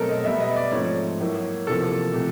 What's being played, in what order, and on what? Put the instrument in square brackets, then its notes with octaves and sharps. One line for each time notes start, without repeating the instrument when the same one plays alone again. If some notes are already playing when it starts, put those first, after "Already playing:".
Already playing: [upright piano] B2 F#3 A3 C4 A4 A#4
D#5
B2 G3 B3 E5
D#5
D5
G#2 F3 A3 C4 C#5
A2 F#3 A#3
E2 C3 F3 A#3 A4
C3 F3 A3